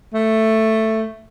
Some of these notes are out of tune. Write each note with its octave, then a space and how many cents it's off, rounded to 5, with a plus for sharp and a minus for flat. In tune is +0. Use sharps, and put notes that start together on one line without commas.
A3 +5